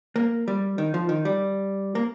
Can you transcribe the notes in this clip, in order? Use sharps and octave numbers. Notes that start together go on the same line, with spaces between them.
A#3
G3
D#3
F3
D#3
G3
A#3